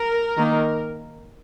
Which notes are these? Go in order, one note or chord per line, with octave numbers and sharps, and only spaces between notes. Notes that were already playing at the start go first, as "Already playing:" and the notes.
Already playing: A#4
D#3 A#3